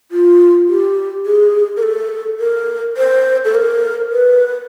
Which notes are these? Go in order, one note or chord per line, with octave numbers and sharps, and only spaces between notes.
F4
G4
G#4
A#4
A4
A#4
C5
A4
A#4
B4